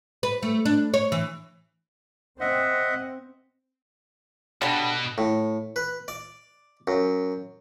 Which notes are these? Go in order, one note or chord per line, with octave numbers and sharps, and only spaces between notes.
B4
A3
D4
C#5
E3
C4 D#5 E5 F#5
B2 D3 G3
A2
B4
D5
F#2